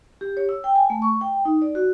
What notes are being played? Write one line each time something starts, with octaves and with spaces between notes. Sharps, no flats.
G4
C#5
E6
G5
G#5
A3
C#6
G5
D#4
D5
F#4